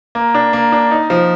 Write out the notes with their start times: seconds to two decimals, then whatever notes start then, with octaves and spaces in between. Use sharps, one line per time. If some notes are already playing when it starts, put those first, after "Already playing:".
0.15 A#3
0.34 D4
0.53 A#3
0.72 D4
0.91 D#4
1.10 F3